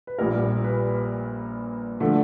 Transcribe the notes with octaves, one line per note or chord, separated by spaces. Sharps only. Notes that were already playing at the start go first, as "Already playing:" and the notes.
B4
A#1 A#2 G3 A#4
B4
D3 F3 A3